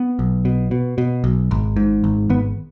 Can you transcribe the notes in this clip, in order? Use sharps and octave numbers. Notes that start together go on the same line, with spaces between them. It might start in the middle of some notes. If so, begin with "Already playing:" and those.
Already playing: B3
B1
B2
B2
B2
B1
G#1
G#2
G#1
G#1 B3